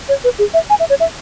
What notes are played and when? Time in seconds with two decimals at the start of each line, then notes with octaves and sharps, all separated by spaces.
0.09 C#5
0.24 B4
0.39 G#4
0.54 E5
0.70 G#5
0.80 E5
0.90 C#5
1.00 E5